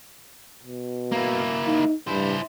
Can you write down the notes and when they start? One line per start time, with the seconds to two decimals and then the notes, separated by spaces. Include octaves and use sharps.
0.63 B2
1.12 A#3 E4
1.67 D#4
2.08 G2 E4 C5